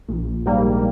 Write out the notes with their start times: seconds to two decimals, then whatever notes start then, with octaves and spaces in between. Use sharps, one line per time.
0.08 A#1
0.46 G#2 G3 A#3